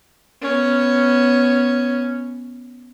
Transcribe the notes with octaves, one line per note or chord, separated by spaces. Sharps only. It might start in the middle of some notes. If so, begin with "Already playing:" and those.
B3 C#4